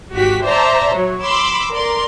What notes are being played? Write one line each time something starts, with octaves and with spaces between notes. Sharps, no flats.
G#1 F#4 G4 B6
C5 D5 E5 A5 A#5 C6
F#3 C#5
B5 C6 D6 E6
A#4 D5 C6